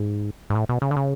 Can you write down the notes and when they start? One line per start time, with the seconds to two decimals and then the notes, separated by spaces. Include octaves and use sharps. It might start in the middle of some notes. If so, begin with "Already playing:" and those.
Already playing: G#2
0.50 G#2
0.55 A2
0.69 B2
0.82 C#3
0.91 D3
0.96 C#3